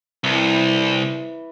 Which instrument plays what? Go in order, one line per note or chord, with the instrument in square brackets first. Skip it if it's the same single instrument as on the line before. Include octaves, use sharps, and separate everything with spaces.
[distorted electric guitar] C2 [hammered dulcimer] E3